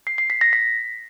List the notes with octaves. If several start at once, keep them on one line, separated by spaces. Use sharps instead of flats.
C7
C7
B6
A#6
B6